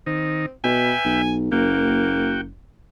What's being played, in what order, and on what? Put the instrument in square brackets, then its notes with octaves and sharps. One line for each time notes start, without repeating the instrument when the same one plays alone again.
[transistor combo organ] D#3 D#4 [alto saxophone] C4
[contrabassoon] B2 [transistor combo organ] B4 E5 G5 [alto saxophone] G#5
[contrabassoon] B1
[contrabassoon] F#1 [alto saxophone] A#3 [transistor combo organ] F#4 G5